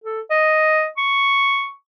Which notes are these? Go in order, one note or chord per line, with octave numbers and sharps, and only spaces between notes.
A4
D#5
C#6